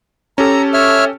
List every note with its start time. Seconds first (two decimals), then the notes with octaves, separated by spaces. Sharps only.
0.38 C#4 G4 A4 A#5
0.74 C#5 E5 F6